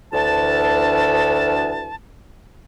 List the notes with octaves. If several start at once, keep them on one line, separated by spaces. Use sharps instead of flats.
D2 E3 A5